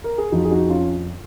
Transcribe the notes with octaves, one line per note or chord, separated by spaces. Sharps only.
A#4
G#4
F2 F3 D#4 F#4
G#4
D#4 F#4
C#4 F4